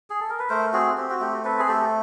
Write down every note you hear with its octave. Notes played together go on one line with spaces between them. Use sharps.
G#4
A4
A#4
B4
A3 A#4 C5
C4 F#4 G#4
C4 G4
F#4
A3 G4
C4 A4 B4
G#4
A3 G4 A4